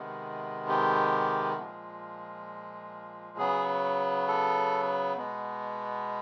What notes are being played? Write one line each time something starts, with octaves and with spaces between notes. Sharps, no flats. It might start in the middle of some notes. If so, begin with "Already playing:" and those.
Already playing: C3 D#3 G#3 B3
G4
A#2 F3 G#3
C#3 F#3 B3 G#4
A4
B2 G#3 B3